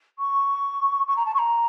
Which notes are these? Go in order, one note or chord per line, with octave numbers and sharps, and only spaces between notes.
C#6
C#6
A#5
A5
C#6
A#5